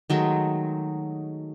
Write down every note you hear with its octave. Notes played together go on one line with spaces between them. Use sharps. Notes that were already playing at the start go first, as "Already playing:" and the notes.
D#3 F#3 G#3 A3